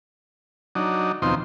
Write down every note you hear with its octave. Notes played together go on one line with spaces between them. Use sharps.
F#3 D4 D#4
D#2 B2 F3 C4 D#4 C6